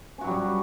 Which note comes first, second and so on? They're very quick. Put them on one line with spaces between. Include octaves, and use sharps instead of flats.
C#4 F#4 F#3 G3